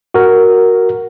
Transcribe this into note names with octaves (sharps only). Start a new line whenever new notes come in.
F#4 A#4